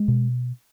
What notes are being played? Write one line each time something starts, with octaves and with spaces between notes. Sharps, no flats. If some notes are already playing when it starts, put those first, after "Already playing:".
Already playing: G#3
B2